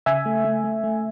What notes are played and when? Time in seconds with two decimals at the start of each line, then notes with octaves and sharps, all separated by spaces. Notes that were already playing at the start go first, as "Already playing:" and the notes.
0.06 C#3 E5 G#5
0.26 A3
0.45 A3
0.64 A3
0.84 A3